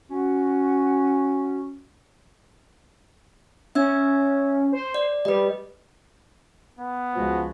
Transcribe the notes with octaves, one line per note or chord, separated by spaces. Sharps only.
C#4 F#4
C#4 E5 E6 G#6
C5
D5
G3 B4 D#5
B3
C#2 F3 G#3 F#4